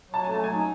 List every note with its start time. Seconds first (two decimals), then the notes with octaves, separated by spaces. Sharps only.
0.09 F#3 A5
0.24 A3 G#5
0.34 A5
0.39 F#3 G#5
0.53 D#4